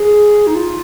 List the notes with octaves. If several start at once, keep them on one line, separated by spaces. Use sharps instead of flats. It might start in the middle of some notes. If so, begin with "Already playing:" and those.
Already playing: G#4
D#4
F4